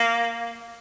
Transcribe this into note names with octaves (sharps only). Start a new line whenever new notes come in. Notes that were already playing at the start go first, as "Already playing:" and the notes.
Already playing: A#3